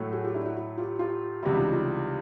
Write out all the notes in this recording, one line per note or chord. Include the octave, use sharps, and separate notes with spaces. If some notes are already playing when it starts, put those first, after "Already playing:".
Already playing: A2 F#3 A3
F#4 G#4
F4 G4
D4 E4
E4 F#4
E4 F#4
F4 G4
F4 G4
C#2 C3 E3 G3 E4 F#4
D#4 F4
D#4 F4